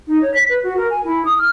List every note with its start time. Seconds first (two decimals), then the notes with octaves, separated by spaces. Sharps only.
0.08 D#4
0.22 C#5
0.34 B6
0.49 B4
0.63 F#4
0.77 A#4
0.90 G#5
1.04 E4
1.25 D#6
1.39 F6